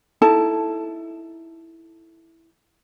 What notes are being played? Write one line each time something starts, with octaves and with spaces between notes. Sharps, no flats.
D#4 E4 A4 A5